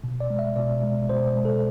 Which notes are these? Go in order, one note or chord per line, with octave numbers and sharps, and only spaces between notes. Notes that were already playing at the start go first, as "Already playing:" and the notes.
B2
D5
G#3
E5
B2 D5
G#3
B2 C5
C5
G#3
A4